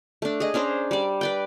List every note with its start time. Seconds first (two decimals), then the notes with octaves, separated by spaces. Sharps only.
0.22 A3 D4
0.40 G#4 D#5
0.54 C#4 D4 C5 A#5
0.91 G3 D5
1.21 B4 D5 G5